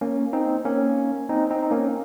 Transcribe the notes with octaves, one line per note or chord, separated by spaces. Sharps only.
A#3 C#4
C4 D#4
A#3 C#4
C4 D#4
C4 D#4
D#4
A#3 C#4